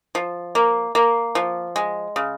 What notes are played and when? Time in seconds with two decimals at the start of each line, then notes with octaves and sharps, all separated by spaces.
0.15 F3
0.55 A#3
0.95 A#3
1.35 F3
1.76 G#3
2.16 C#3